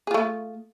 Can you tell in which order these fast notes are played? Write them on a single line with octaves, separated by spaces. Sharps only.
G#4 F4 A3